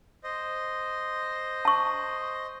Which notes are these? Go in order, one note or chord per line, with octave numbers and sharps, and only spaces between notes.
C5 D#5
A5 C#6